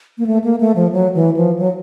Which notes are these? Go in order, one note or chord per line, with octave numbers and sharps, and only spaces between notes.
A#3
A3
A#3
A3
F3
F#3
E3
F3
F#3